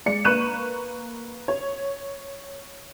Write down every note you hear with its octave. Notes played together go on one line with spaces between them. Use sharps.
G#3 D5 C#7
A#3 B4 C#6 F#6 D#7 E7
C#5